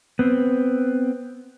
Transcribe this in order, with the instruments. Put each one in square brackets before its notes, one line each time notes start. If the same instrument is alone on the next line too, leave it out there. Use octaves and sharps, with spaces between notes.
[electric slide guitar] B3 C4